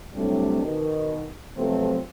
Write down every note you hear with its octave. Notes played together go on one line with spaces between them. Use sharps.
A2 C3 F#3 G3 A3 D4
B2 D#3
C3 F3 F#3 A3 B3 C4